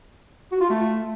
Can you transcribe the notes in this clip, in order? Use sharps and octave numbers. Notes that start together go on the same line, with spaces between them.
F#4
F4
A3